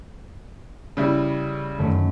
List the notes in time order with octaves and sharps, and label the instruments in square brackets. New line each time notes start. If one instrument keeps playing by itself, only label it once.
[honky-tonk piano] C#3 G3 E4
[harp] F#2 D#3 A3